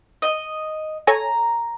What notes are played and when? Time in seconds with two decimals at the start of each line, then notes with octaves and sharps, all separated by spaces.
0.22 D#5
1.07 A4 C#5 G#5 A#5